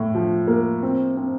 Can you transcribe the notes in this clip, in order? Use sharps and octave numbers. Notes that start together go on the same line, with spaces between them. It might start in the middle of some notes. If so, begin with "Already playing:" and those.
Already playing: A2
F3
A#3
C4
C4